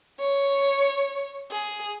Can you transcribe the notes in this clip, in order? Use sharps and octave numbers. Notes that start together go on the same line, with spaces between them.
C#5
G#4